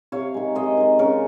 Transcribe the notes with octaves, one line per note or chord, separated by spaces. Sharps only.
C3 C#5 F5
D#3 G#3
C3 C5 D#5
D#3 G#3
C#3 A#4 C#5